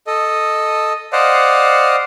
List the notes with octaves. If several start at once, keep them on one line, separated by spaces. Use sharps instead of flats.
A4 D#5
C5 D5 D#5 F5 F#5